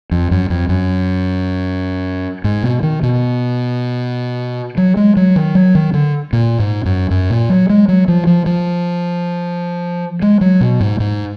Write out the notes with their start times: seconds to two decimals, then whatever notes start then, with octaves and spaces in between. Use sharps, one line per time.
0.11 F2
0.31 F#2
0.50 F2
0.69 F#2
2.44 G#2
2.63 B2
2.83 D#3
3.03 B2
4.77 F#3
4.97 G#3
5.17 F#3
5.36 D#3
5.55 F#3
5.75 D#3
5.93 D3
6.33 A#2
6.59 G#2
6.85 F#2
7.10 F#2
7.30 A#2
7.49 F#3
7.70 G#3
7.89 F#3
8.08 F3
8.27 F3
8.46 F3
10.22 G#3
10.41 F#3
10.61 B2
10.80 G#2
11.00 G#2